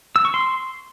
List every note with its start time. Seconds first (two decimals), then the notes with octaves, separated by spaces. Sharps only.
0.16 E6
0.25 C#6
0.34 C6